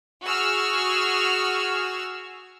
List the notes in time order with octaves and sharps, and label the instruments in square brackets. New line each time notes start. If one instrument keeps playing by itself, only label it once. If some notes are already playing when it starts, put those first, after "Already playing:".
[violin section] F#4 G#4 E6 F6